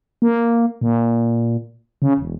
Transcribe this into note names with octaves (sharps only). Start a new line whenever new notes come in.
A#3
A#2
C#3
E1